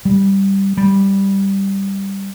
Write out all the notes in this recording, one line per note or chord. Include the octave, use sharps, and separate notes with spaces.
G3
G3